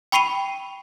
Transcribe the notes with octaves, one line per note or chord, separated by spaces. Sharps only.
G5 B5 C#6 C7 D#7 F7